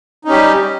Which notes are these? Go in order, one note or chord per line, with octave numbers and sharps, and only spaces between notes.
G3 C#4 D#4 G4